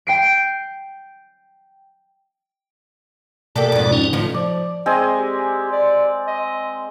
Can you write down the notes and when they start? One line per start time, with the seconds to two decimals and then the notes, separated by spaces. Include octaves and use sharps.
0.07 G5 C7 D7
3.56 B2 A#3 G4 A4 D5
3.72 F2 G#2
3.92 C#4 D#4
4.13 A2 C#3 F3
4.34 F3 D5
4.86 G#3 C4 D#5 G#5
5.18 G4
5.72 D5
6.27 D#5